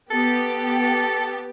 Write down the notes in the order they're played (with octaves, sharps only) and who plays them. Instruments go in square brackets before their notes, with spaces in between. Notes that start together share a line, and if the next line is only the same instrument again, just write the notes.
[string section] B3 G4 [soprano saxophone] A4